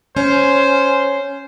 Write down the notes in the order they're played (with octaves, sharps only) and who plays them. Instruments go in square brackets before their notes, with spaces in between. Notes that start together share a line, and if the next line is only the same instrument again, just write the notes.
[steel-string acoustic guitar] C#4 [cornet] C5